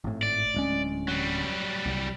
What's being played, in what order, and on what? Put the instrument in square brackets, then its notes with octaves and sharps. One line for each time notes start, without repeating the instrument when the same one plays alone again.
[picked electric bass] G#1 A2
[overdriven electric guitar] D5
[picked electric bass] D1 G#3 C#4
[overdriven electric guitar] F#3 G3
[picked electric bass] C2